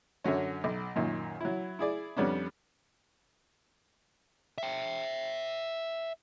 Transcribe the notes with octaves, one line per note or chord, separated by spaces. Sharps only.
F#2 D3 F#3 C#4
B1
F#2 A#2 D#3
F#3 E4
E4 G#4 D5
F2 G3 B3 C#4 D4
E5 G5